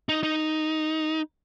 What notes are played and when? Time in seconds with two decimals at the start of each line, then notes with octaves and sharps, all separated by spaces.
0.09 D#4
0.23 D#4